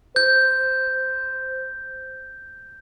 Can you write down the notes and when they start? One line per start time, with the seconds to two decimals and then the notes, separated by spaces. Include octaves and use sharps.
0.16 C5 G6